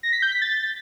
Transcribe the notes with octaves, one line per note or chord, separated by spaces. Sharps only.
A#6
B6
G6
B6
A6